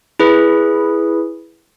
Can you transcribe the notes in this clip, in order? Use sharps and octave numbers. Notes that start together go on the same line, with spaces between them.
E4 G#4 B4